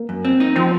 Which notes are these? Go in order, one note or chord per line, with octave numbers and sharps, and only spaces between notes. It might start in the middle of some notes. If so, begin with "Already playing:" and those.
Already playing: A#3
F#2
C4
D#4
F3 C4